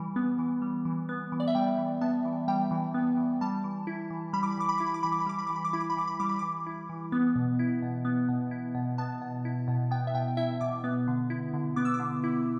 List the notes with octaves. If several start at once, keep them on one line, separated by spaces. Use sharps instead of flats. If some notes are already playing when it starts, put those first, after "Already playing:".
Already playing: E3 G3
B3
E3
G3
E3
B3
E3
D5
E5
G3 G5
E3
B3 A5
E3
G3 G5
E3
B3
E3
G3 A5
E3
E4
E3
G3 B5
D6
B5
E3 D6
B5
E4 D6
B5
D6
E3 B5
D6
B5
G3 D6
B5
E3 D6
B5
D6
E4 B5
D6
B5
E3 D6
B5
G3 D6
B5
E3 D6
E4
E3
B3
B2
E4
B2
B3
B2
E4
B2
B3 A5
B2
E4
B2
B3 G5
E5
B2 G5
E4 E5
B2 D6
B3
D3
E4
D3
B3 D6
E6
D6
D3
E4